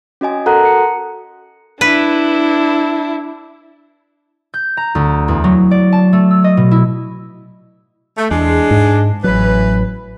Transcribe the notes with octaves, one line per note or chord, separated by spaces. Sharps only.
C#4 F#4 D#5 G#5
F#4 A4 A#4 F#5 A#5 F#6
C#7
D4 E4 B4
G6
A#5
D2
E2
F#3
D5
A5
A3
E6
D#5
B2
E4
A3
E2 G#3 D4
G#2
A1 E3 F#3 B4